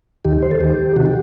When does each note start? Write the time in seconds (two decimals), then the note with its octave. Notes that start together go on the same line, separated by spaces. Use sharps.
0.25 D#2 D#3 G4
0.42 C5
0.51 A4
0.60 D#2 D#3 G4
0.96 C3 D#3 F#4
1.06 G4